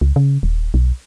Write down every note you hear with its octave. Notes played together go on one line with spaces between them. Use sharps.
C#2
C#3
D#1
B1